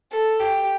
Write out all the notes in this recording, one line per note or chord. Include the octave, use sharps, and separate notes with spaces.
A4
G4